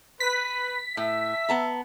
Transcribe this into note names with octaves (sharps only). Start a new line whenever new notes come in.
B4 B6
A2 E5
B3 A5 A#5